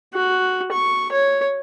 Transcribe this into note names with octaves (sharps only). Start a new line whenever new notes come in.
F#4
C#6
C#5